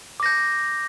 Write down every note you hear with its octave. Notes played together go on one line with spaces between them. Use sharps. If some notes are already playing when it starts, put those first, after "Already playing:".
D6 G6 A#6